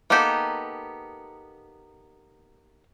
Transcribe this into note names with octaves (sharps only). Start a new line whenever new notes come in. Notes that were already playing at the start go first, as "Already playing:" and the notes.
A#3 B3 D#4 G4 A4